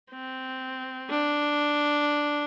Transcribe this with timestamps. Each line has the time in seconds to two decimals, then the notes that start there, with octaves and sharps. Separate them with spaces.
0.11 C4
1.10 D4